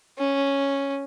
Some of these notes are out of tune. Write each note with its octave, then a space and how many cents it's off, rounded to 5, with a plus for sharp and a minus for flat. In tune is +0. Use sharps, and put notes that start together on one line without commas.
C#4 +0